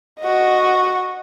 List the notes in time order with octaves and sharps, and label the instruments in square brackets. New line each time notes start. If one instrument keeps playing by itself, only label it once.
[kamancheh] F#4 D#5